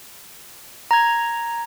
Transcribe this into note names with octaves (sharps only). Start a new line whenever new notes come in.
A#5 G#6